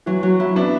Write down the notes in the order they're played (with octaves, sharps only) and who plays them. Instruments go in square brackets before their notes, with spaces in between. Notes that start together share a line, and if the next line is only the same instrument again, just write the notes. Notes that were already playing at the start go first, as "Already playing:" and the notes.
[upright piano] E3 [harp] F#3
[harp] F#3
E4
[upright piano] B3 D4 [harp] E4